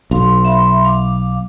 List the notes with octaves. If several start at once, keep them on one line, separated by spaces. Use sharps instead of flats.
B1 F5 C6
E5 B5 C6
F5 D6